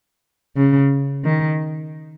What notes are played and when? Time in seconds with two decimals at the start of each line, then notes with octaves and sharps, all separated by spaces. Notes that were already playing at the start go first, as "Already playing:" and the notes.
0.57 C#3
1.24 D#3